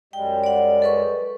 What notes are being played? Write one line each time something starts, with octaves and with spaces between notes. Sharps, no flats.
F#2 G3 G#3 G5
D5 F#5
A4 B4 C#6